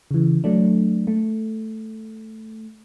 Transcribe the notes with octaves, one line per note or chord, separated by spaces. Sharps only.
C#3 E3
F#3 A3 D4
A3